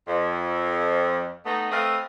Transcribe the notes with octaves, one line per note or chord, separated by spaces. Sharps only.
F2
A3 B3 D#4
A3 C4 B4 D#5 F5